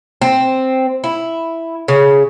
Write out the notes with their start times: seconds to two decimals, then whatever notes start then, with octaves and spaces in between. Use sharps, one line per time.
0.22 C4
1.04 E4
1.88 C#3